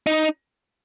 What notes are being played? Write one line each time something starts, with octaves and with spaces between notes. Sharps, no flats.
D#4